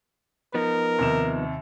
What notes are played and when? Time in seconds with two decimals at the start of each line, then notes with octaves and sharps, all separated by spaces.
0.54 F3 B3 D#4 A#4
0.99 D#2 C3 E7